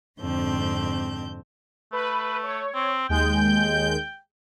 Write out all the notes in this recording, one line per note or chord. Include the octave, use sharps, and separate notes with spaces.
F2 G#2 D3 C4 A5 G6
A3 B4
C#5
C4
D#2 G#3 G5 G6